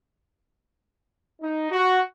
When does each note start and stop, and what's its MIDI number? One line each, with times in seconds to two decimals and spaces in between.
1.41 1.69 63
1.71 1.99 66